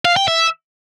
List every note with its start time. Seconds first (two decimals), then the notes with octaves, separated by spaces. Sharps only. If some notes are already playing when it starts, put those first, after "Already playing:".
0.05 F5
0.16 G5
0.28 E5